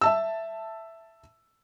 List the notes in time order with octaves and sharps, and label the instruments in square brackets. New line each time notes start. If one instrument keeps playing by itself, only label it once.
[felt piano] E5 A5 E6